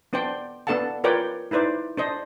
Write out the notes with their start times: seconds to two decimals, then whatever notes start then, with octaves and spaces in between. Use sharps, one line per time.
0.13 B3 D4 C5 D5 G5
0.67 B3 D4 A4 F5 F#5 A5
1.04 F4 A#4 B4 C#5 D5 G5
1.51 D#4 E4 B4 C5 D5
1.97 D4 C5 D#5